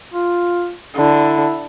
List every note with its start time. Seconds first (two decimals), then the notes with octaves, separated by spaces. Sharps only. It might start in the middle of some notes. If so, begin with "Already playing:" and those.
0.14 F4
0.96 D3 E4